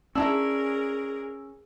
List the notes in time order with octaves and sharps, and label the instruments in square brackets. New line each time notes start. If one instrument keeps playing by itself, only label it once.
[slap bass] C#4 [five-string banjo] D4 E4 A#5 [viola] G#4 A#4 [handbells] E6